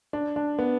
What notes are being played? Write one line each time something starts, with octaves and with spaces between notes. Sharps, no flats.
D4
D4
B3